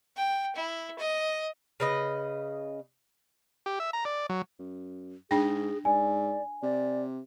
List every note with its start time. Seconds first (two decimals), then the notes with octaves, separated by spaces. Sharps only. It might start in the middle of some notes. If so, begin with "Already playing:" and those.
0.16 G5
0.56 E4
0.99 D#5
1.80 C#3 B4 D#5
3.66 G4
3.80 E5
3.93 A#5
4.05 D5
4.29 F#3
4.59 F#2
5.31 G#2 D4 G#4 G5 A#6
5.85 G#2 D5 G#5
6.63 C3 D5